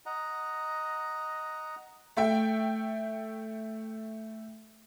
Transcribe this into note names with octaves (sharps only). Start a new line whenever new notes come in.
D#5 F#5 A#5
A3 E5 G5